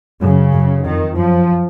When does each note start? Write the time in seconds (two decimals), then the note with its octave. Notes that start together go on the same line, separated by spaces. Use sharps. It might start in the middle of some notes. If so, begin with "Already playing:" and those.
0.20 F#2 C#3
0.52 F#2
0.84 F2 D#3
1.16 F#2 F3